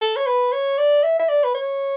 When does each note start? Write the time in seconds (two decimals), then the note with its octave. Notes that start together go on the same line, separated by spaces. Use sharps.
0.01 A4
0.16 C#5
0.27 B4
0.52 C#5
0.78 D5
1.03 E5
1.19 E5
1.29 D5
1.44 B4
1.54 C#5